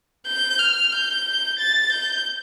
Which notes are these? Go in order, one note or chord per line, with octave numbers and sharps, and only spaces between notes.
G6
F6
G6
A6
G6